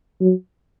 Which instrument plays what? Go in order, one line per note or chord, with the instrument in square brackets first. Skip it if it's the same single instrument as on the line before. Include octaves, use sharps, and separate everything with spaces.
[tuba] F#3